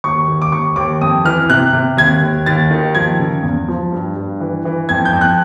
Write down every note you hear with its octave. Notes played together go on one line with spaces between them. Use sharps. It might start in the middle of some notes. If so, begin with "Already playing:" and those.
D#2 C#6
D#2
D6
D#2 C#6
D#2 D6
F2 D#6
E3 F6
C3 F#6
C3
D#2 G#6
D#2
D#2 A6
D#3
F3 G#6
C#3
E2
F3
G2
G2
E3
E3
F2 G#6
G6
F2
F#6